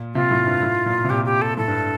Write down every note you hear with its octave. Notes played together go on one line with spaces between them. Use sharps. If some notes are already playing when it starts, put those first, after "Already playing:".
Already playing: A#2
C3 F4
A2
G2
A2
A#2
C3
A#2 G4
G4
A4
A2 A4
G2